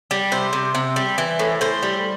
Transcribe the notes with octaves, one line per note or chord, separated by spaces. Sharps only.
G3
C3 C5
C3
C3
G3
E3
A2
A2 C5
G3